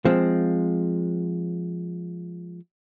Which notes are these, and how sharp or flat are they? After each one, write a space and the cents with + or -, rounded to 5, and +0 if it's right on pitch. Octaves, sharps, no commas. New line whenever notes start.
F3 +0 G#3 +0 C4 +0